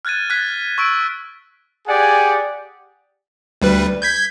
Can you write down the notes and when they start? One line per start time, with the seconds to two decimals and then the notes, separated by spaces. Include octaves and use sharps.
0.05 F6 F#6 G#6 A6 D#7
0.30 F6 F#6 G#6 A6 B6
0.78 C#6 E6 D7
1.88 G4 G#4 D5 F#5 G#5
3.61 D2 G3 B4
4.02 G6 G#6 B6